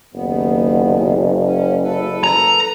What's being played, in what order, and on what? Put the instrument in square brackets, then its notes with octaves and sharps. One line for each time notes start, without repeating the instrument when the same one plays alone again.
[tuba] F#1 [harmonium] D#2 B3
[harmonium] C#4
A4 B4
[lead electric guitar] A#5